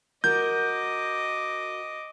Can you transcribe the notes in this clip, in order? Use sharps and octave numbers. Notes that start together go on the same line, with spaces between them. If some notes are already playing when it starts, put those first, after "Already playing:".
F#4 A#4 D#5 D6 G6